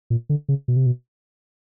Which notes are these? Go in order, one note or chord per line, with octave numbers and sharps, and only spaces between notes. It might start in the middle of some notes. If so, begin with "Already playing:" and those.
A#2
D3
C#3
B2
C3
B2